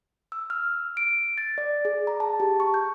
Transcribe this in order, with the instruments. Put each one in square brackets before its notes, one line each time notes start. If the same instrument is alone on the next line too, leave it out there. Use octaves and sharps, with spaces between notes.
[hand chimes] E6
F6
D7
A6
D5
G#4
A#5
A5
G4
C#6
G6